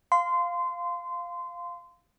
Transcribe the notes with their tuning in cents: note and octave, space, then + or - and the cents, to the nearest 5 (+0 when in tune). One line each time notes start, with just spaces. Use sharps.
F5 +0 C6 -20